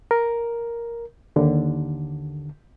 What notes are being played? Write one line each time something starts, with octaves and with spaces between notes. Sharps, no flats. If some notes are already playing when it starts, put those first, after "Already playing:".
A#4
D#2 D3